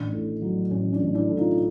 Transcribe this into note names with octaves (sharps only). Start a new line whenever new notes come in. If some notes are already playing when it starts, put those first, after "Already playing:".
Already playing: A1 D4
A2
F#3
A1 C#4
D4
A1
D4 E4
A2
D#4 F4